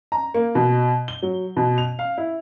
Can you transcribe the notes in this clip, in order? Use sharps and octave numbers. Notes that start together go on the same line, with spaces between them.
A#5
A#3
B2
G7
F#3
B2
F7
F5
E4